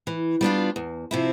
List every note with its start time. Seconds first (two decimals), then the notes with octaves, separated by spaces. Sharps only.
0.07 E3
0.41 G3 B3 D4 F4
0.76 E2
1.11 C3 F3 C4 E4